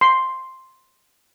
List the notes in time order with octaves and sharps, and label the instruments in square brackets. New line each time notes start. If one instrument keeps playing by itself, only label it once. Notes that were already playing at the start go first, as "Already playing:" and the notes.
[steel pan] C6